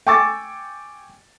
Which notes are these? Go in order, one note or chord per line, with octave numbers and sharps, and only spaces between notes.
G5 G#5 C#6 D6 E6 A6